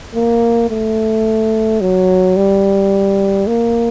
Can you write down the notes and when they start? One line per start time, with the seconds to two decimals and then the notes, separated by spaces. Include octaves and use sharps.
0.15 A#3
0.70 A3
1.81 F#3
2.37 G3
3.47 A#3